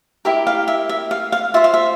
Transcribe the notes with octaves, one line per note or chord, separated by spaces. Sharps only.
E4 G4 A#4 E5
F5
E5
E5
F5
F5
F4 C5 E5
F5
E5